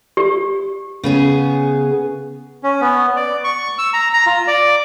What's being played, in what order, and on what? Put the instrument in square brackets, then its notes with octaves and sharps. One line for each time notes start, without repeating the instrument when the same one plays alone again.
[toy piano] G4
[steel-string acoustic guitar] C#3 B3 G#4
[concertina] C#4
B3
D5
C#6
E6
A#5
A#5
F4
D5